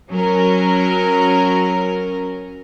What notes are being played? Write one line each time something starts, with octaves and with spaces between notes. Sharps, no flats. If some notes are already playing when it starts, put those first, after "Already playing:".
F#3 C#4 A#4